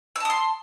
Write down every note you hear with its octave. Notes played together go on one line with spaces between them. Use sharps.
A5 C6 D#6 E6